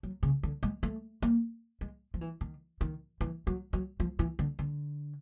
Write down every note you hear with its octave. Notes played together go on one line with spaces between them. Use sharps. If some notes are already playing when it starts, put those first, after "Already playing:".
F#3
C#3
D3
G#3
A3
A#3
G#3
F3
E3
D#3
D#3
E3
F#3
F#3
F3
E3
D3
D3